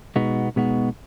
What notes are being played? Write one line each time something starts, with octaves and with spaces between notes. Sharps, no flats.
B2 G#3 B3 D#4 F#4
B2 G#3 B3 D#4 F#4